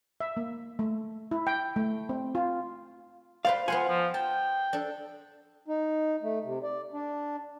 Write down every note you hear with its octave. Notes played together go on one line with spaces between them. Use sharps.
E5
A#3
A3
E4
G5
A3
C4
F4
B4 C5 D5 F5
B3 F4 C5 F#5 G#5
F3
G5 A5
D4 A4
D#4
A3
C3
D5
D4